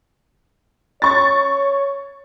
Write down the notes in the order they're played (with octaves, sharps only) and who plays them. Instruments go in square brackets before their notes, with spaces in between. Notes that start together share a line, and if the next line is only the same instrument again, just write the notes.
[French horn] C#5 [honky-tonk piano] C#6 A6